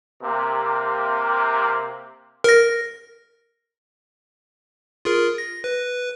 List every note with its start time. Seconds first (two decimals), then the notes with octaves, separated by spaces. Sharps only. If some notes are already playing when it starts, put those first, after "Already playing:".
0.22 C3 A#3
2.44 A#4 A#6
5.05 F4 G#4 A#4
5.38 A#6
5.64 B4